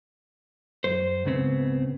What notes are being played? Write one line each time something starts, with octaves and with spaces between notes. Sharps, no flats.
F#2 C5
C#2 G#2 C#3 B3 C4